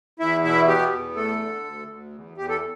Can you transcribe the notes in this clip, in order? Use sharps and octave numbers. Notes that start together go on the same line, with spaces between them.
E2 E4 E5
B2 E4 E5
B3 G4
E2
A3 A4
D3
D2
D2
E2
E2 G4
A4